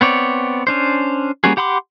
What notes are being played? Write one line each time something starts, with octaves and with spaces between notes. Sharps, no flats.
B3 C4 C#5 D5
C#4 D4 C5
G3 A#3 C#4 F#4 G#4
G4 F#5 B5 C6 D6